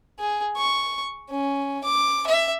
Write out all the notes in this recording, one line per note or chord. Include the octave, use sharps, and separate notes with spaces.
G#4
C#6
C#4
D6
E5